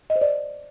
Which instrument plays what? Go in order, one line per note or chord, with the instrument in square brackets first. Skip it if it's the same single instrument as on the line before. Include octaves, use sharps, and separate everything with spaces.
[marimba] D#5
C5
D5